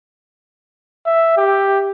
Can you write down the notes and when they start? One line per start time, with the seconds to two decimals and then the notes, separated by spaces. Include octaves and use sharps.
1.06 E5
1.37 G4